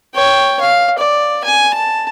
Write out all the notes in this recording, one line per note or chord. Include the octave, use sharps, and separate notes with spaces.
C#5 G5
F5
D5
G#5
A5